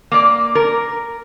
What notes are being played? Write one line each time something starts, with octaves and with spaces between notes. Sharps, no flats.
A#3 D5
A#4